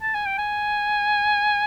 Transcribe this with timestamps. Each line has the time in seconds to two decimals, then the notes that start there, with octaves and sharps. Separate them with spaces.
0.02 A5
0.14 G#5
0.26 G5
0.38 G#5